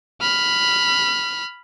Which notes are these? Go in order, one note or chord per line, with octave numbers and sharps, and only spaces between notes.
B5 F6